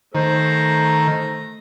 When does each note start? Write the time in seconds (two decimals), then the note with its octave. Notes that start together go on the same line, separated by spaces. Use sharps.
0.15 D#3 A3 C5 A#5